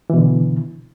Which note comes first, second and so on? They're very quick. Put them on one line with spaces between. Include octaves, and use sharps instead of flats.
E3 B2 D3